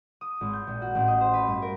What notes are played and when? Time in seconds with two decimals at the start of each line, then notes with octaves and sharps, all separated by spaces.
0.21 D#6
0.41 G#1
0.53 G6
0.67 A#1
0.82 F#4
0.95 A1
1.08 D#5
1.21 C5
1.33 B4
1.47 G2
1.62 A#4